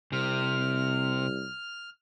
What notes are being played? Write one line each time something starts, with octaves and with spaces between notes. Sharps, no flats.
C2 C3 F6